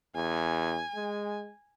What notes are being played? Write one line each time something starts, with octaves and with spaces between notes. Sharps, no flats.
E2 G#5
G#3